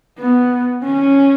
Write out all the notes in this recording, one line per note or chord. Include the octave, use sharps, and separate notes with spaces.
B3
C#4